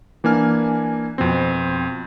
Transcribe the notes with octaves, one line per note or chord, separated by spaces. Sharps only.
E3 A#3 D4 G#5 F6
F2 B2 C4